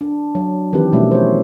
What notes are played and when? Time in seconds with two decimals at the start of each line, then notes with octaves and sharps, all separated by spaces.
0.01 D4
0.35 F#3
0.73 D#3 E3 F#3 C4 G4 B4
0.92 B2 F3 G3 A3 C#4 E4
1.11 C5 C#5